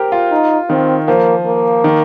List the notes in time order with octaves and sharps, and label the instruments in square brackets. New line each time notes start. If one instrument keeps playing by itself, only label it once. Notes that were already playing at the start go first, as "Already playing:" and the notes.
Already playing: [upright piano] G4 A#4 C5
F4
[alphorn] D#4
[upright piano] D#3 [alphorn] C4
[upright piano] F3 [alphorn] A#3
[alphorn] A#3
[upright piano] D#3